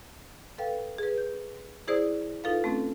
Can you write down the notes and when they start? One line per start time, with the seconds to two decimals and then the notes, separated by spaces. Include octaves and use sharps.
0.58 A4 B4 F5 G5
0.98 G#4 B4
1.18 G6
1.88 E4 G#4 C5 D5 D#6
2.44 D#4 F4 A4 B4 F5
2.64 A3 C4 C#4 A4